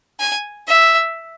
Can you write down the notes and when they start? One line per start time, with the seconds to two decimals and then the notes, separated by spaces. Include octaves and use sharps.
0.19 G#5
0.67 E5